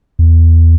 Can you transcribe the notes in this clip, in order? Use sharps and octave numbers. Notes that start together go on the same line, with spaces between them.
E2